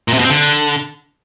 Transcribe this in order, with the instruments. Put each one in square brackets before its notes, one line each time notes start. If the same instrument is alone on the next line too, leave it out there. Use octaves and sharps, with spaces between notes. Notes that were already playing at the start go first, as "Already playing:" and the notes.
[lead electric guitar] A#2
C3
B2
C4
D3